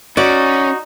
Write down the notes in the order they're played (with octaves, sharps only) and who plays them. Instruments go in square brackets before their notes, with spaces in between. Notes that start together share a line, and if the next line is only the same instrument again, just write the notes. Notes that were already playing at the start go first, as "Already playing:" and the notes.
[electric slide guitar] C#4 [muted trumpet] D#4 [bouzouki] F#4 [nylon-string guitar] D5